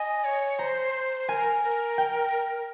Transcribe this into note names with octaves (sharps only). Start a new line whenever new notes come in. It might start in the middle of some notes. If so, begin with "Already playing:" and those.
Already playing: D#5 G#5
C#5
C5 A#5
A#4 G#5
A#4
G5